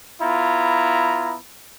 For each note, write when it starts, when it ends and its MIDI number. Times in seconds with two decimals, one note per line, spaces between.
0.22 1.36 59
0.22 1.36 64
0.22 1.36 65
0.22 1.36 82